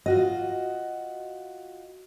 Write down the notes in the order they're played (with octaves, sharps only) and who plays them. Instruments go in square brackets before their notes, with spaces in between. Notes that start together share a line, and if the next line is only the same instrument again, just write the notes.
[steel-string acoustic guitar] F4 F#4 D#5